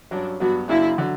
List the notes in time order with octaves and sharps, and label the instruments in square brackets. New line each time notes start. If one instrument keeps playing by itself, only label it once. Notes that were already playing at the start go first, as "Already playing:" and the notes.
[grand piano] G2 F#3 C#4 [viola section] D4
[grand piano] G2 F#3 B3 [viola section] F#4
[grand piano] F#2 C#3 F#3 A#3 D4 [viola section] E4
[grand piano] D3 F#3